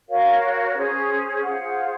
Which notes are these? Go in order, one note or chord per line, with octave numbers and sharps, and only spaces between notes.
F#4 A#4 C#5 F5
C#4 G#4 C5
F4 G#4 C5 F#5